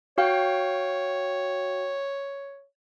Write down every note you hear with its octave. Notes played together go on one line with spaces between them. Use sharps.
F#4 C#5 F5 G5